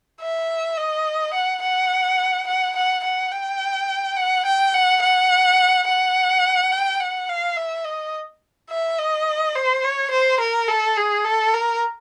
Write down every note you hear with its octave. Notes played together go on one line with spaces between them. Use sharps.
E5
D#5
F#5
F#5
F#5
F#5
F#5
G5
F#5
G5
F#5
F#5
F#5
G5
F#5
F5
E5
D#5
E5
D#5
C5
C#5
C5
A#4
A4
G#4
A4
A#4